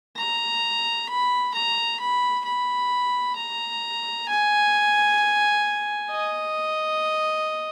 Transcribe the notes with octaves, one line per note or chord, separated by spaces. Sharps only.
A#5
B5
A#5
B5
B5
A#5
G#5
D#5